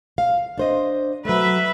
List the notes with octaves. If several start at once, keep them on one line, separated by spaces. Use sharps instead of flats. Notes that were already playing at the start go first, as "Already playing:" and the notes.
F5
D4 C5 D#5
F#3 A3 B4 E5